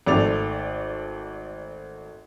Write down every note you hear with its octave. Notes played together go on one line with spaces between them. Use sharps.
G#1 A3 D5 F7